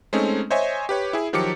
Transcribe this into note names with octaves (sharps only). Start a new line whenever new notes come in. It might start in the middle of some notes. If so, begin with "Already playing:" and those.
G#3 A3 C4 C#4 D#4
C5 C#5 D#5 E5 G#5
G4 B4 C#5
E4 G#4
D#3 F3 F#3 G4 D6 C#7